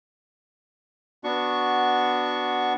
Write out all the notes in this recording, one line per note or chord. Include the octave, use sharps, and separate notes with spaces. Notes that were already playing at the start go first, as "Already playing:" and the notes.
B3 D4 F#4 C#6